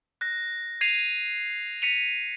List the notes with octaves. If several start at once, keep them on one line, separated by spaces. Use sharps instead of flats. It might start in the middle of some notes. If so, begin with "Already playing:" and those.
F#6 A#6
G#6 C7 D#7 F7
B6 C#7 D#7 F7